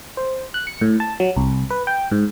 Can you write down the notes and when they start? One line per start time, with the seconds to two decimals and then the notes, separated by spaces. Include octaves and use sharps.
0.17 C5
0.54 F#6
0.67 C#7
0.81 A2
1.00 A5
1.20 F#3
1.36 C2
1.71 B4
1.87 G5
2.11 G#2